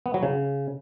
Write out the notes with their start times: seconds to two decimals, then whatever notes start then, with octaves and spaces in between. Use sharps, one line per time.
0.06 B3
0.14 F#3
0.23 C#3